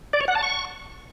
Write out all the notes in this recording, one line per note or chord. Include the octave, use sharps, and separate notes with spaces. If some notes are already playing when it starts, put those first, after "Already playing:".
D5
C#5
F#5
A5
C#6